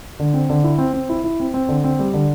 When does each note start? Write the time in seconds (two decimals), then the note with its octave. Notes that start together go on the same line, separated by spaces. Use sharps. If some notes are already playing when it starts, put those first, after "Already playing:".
0.19 D3
0.34 C4
0.50 D3
0.64 E4
0.78 C4
0.93 C4
1.09 E4
1.24 E4
1.40 C4
1.54 C4
1.69 D3
1.84 C4
1.99 G3
2.14 D3